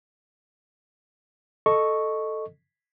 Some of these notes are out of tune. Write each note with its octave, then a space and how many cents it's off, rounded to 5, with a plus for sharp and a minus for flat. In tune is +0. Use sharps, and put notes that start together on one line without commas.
A4 +0 D#5 -10 C#6 +0